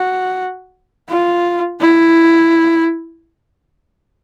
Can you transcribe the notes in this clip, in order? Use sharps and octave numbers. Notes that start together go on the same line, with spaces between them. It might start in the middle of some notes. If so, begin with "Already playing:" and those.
Already playing: F#4
F4
E4